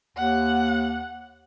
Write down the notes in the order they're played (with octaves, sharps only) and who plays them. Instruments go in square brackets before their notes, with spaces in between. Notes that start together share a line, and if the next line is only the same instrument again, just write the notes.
[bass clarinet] D#2 [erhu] F#5